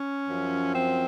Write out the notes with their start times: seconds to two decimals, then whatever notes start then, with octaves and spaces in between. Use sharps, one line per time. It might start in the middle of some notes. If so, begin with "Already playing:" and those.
Already playing: C#4
0.28 F#2 F3
0.74 C4